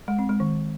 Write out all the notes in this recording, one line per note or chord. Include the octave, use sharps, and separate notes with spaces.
G#3
C4
G#3
D#3